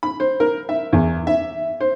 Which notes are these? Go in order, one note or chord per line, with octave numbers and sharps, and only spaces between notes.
B5
C5
A#4
E5
E2
E5
C5